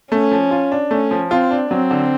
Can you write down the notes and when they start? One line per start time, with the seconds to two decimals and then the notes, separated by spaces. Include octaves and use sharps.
0.12 A3 C#4
0.31 F3
0.51 F4
0.72 D4
0.91 A3 C#4
1.11 F3
1.31 C4 F4
1.51 D4
1.71 F#3 C4
1.91 D3